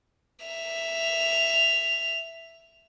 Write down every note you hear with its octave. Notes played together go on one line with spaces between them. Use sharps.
E5 F7